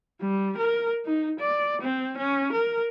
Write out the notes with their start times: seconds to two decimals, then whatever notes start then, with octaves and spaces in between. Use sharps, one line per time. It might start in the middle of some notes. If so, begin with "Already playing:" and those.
0.20 G3
0.57 A#4
1.06 D#4
1.40 D5
1.82 C4
2.18 C#4
2.52 A#4